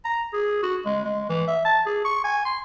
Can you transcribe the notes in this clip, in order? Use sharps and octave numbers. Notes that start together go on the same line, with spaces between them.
A#5
G#4
F#4
G#3
G#3
E3
E5
A5
G#4
C#6
G#5
C6